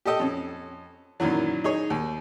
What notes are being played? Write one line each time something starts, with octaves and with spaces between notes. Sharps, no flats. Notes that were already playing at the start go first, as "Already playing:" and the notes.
G4 A4 D#5 G5
F2 C#4
F#2 A#2 D#3 E3 F#3
D#4 G#4 C#5
D#2